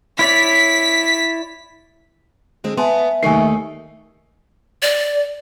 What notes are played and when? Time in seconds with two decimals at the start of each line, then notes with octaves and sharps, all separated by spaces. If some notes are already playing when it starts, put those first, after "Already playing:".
0.19 E4 C#5 D5 B6
2.64 D3 G#3 C4
2.77 B3 E5 G#5 A5 C6
3.23 D#2 A3 D#4 A#4 G#5 C#6 C7
4.82 D5